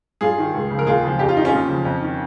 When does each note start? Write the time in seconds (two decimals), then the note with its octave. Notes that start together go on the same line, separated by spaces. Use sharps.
0.21 G2 F4 G#4
0.38 D#3
0.54 C#2
0.70 C#3 F3
0.79 A#4
0.86 D#2 F4 G#4
1.03 C#3 F3
1.19 F2 G4
1.28 F4
1.36 D#3 D#4
1.45 C#4 F4
1.53 D#2
1.68 C#3 F3
1.85 F2
2.02 D#3